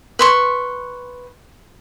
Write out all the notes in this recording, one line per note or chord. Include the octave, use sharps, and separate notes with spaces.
B4 C6 C#6